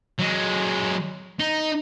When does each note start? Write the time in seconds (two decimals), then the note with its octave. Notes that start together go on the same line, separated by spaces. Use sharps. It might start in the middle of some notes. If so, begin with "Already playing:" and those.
0.19 F#3 G#3
1.40 D#4